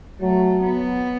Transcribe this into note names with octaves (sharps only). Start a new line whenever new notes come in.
F#3 A3
B3